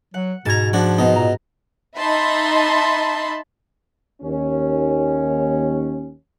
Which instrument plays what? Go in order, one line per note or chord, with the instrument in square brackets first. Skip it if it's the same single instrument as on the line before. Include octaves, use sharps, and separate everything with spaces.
[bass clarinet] F#3 [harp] F#5
[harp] G#2 G#6 [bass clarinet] B2 [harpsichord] A5 A#5
[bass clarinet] F3 [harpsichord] D4 F#4
[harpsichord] B2 D#4
[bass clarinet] A#2 [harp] A#5
[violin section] D#4 E5 A5 B5 C6
[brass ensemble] D#2 C#4